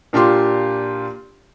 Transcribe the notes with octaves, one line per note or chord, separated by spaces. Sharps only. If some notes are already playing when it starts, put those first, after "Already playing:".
A#2 D4 F4 G4 C6